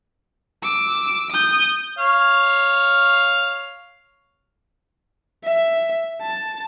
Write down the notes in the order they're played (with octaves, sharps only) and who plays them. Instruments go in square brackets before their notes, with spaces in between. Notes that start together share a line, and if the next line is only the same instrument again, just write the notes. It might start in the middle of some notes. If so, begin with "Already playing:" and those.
[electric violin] D6 E6
D#6 G6
[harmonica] C#5 F5
[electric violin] E5
A5